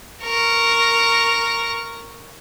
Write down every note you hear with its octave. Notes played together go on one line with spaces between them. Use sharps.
A#4 C#6